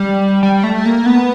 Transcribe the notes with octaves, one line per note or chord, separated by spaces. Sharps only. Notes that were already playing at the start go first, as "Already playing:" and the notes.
Already playing: G3
G3
A3
A#3
B3